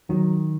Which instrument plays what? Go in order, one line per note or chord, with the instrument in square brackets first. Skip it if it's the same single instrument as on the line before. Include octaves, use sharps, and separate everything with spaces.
[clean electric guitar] D#3 [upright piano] F#3